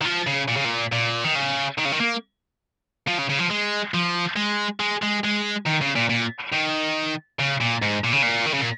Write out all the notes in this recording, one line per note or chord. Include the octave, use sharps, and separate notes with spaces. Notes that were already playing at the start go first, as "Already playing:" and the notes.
D#3
F3
C#3
A#2
C#3
A#2
A#2
D#3
C#3
D#3
C#3
D#3
A#3
F3
C#3
C#3
F3
G#3
F3
G#3
G#3
G#3
G#3
D#3
C#3
A#2
A#2
D#3
C#3
A#2
G#2
A#2
C#3
A#2
D#3
C#3
A#2